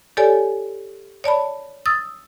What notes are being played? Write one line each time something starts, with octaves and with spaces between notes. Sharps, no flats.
G4 A4 C#5 D5 G#5
C#5 D5 A5 B5
D#6 E6 A6